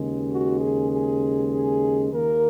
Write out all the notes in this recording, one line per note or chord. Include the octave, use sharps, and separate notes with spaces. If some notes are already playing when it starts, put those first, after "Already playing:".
Already playing: D#2 C#3 G#3
F#4
G#4
G#4
G#4
D#2 D#3 A#3 A#4